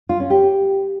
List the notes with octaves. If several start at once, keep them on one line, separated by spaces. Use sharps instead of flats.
F4
C#4
G4